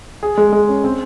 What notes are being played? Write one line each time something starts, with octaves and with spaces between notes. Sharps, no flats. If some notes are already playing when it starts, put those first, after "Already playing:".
G#4
G#3
G#3
C#4
C4